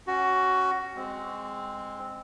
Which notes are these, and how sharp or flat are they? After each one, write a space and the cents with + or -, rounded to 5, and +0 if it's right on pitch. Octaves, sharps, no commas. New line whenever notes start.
C#4 +0 F#4 +15
G#3 -15 C4 +0